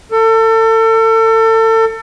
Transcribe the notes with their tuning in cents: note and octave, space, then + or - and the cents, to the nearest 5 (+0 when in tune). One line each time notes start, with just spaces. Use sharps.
A4 +30